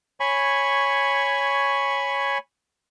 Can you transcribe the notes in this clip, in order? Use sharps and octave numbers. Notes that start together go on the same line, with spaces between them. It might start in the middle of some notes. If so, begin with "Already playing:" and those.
C#5 G#5 B5 C#6